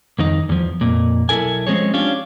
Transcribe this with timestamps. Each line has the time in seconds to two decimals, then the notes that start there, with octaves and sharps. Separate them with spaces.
0.19 F2 D#3 D#4
0.49 E2 F3
0.81 F2 A#2
1.29 B1 B2 E4 A4 A#4 G#5
1.67 F3 G#3 C4 C#4 G#4 C#5
1.94 C#4 D4 F4 G4 C#5